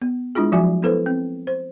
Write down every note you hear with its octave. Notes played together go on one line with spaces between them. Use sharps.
B3
G#3 D4 E4 F4 G#4
F3 F#3 F#4 E5 G#5
B3 E4 A4 B4 C5
C4
C5